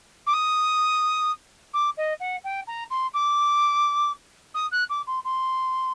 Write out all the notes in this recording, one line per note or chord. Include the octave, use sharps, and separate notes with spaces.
D6
D#6
D6
D#5
F#5
G5
A#5
C6
D6
D#6
F#6
D6
C6
C6